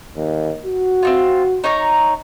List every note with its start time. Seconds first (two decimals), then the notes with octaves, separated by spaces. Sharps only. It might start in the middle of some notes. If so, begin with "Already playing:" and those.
0.17 D#2
0.66 F#4
1.03 C4 D#4 F4
1.64 D#4 C#5 A#5